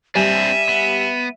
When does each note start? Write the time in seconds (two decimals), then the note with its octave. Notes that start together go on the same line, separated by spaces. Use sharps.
0.15 G3 C4 D4 E5 G#5 D#7 F7
0.69 B3